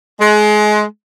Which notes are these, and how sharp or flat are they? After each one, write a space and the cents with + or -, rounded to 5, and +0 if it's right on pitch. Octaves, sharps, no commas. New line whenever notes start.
G#3 +25